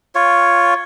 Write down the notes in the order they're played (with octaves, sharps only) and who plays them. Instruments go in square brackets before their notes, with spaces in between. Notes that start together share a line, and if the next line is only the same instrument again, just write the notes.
[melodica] F4 C#5